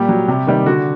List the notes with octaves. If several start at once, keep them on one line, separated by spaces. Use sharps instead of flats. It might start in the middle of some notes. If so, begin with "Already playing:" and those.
Already playing: A#2 G3 G4
F#3
C3
D#3 G3
D3 F#4